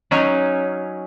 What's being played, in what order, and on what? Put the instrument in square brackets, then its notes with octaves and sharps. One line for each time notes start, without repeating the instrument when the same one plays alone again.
[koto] F#3 C#4 D#4